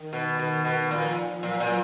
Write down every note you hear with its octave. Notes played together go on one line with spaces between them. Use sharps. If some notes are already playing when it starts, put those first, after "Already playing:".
Already playing: D#3
B2
B2
B2
A#2 F3
A#2 F#3
A#2